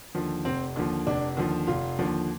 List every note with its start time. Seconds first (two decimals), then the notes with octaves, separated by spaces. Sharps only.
0.15 D#2 D3 F3
0.45 F1 C4
0.76 D#2 D3 F3
1.07 F1 D4
1.37 D#2 D3 F3
1.67 F1 F4
1.99 D#2 D3 F3